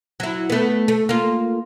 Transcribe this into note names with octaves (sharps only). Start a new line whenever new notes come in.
F#3 E4
A3 B3
A3
A#3 F4